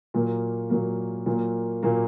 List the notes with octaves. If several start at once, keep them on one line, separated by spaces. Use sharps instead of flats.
A#2 F#3 A#3
A#2 F#3 A#3
A#2 F#3 A#3
A#2 F#3 A#3